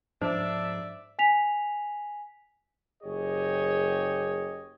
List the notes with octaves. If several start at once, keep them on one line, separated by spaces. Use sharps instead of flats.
G#2 F3 D4 C5 D5 E5
G#5 B6 F7
F#1 G4 G#4 C#5 D#5